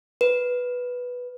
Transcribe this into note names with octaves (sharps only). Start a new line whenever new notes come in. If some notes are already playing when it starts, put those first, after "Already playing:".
B4